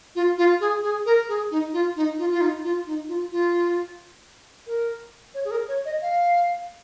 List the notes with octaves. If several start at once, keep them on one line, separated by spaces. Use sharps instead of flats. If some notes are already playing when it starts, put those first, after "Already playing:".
F4
F4
G#4
G#4
A#4
G#4
D#4
F4
D#4
F4
F4
D#4
F4
D#4
F4
F4
A#4
C#5
G#4
A#4
C#5
D#5
F5